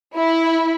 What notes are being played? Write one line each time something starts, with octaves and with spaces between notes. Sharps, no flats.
E4